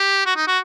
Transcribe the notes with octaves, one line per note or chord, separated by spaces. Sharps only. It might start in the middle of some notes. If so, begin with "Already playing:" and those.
Already playing: G4
F#4
D#4
F#4